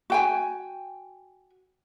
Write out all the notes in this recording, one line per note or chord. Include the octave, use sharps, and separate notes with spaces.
F#4 G5 G#5